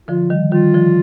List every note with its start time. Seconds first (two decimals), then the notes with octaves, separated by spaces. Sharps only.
0.08 D3 F3 F4
0.30 D#3 G3
0.52 D#3 G3 F4
0.74 D3 F3